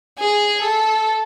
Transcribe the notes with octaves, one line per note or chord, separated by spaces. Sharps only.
G#4
A4